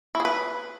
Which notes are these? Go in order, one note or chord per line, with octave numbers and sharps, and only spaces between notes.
E4
G#4
B4